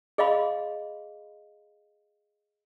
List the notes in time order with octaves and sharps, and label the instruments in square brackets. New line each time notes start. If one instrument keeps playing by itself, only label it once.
[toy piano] G#4 D#5 F5 B5 C6